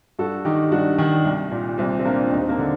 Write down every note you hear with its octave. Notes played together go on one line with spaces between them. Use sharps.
G2 F#4 A4
D#3 D#4 G4
G2 D4 F#4
D#3
C2
A#2
C2 C4
C4
A#2 A#3 D4
D4
D#2 C4 D#4
C4
A#3 D4
D3